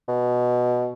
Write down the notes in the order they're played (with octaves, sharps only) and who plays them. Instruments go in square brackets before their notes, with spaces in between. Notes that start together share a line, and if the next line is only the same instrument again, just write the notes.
[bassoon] B2